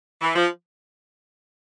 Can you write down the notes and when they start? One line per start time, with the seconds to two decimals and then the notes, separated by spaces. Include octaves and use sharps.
0.22 E3
0.36 F3